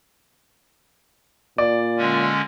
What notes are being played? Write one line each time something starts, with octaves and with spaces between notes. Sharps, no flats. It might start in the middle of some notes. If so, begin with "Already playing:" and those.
A#2 D5
D3 G#3 C#4